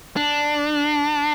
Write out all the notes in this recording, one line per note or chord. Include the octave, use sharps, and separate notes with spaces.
D4